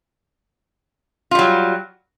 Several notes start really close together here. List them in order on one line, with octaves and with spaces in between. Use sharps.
F4 G3 F#3